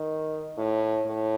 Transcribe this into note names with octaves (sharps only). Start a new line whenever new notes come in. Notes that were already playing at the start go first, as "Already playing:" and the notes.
Already playing: D#3
A2
A2